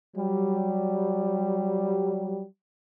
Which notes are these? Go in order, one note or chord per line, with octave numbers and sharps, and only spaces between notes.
F#3 G3